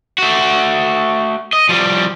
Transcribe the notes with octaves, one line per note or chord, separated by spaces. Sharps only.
A3 F#4
D#5
F3 G3